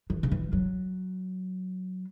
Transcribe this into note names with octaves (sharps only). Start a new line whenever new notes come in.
E3
C#3
E3
F#3